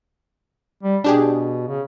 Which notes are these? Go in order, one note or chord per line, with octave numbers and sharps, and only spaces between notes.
G3
B2 D4 G4 G#4
C#3